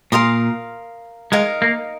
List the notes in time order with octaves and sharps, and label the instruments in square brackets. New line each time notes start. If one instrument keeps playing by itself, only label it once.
[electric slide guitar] A#2 [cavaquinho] A#4 F5 C6 D#6
[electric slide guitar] G#3 [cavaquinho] D#4 A#4 F5
[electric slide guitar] A#3